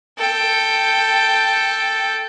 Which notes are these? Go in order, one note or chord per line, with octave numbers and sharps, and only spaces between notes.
A4 G5